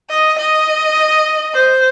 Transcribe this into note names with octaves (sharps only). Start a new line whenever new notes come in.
D#5
D#5
C5